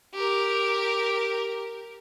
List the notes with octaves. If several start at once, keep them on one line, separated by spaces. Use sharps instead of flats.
G4 A#4